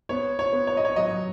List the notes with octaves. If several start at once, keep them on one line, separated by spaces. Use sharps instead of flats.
B3 C#5
C#5
B3
C#5
D#5
C#5
F#3 D#5